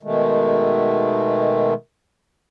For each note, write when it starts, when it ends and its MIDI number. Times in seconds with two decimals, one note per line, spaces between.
0.03 1.74 47
0.03 1.74 51
0.03 1.74 56
0.03 1.74 57